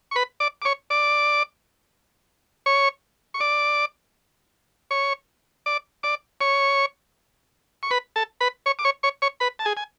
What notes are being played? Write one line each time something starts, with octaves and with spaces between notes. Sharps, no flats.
C#6
B4 B5
D5 D6
D6
C#5 C#6
D5 D6
C#5 C#6
C#6
D5 D6
C#5 C#6
D5 D6
D5 D6
C#5 C#6
C#6
B4 B5
A4 A5
B4 B5
C#5 C#6
D6
C#5 C#6
C#5 C#6
C#5 C#6
B4 B5
A5
G#4 G#5
G#5